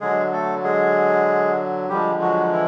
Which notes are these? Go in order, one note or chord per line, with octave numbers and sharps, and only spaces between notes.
D3 F#3 G#3 G#4
A3 A4
G#3 G#4
D3 F3 G3 G#3 G4
F#3 F#4
E3 E4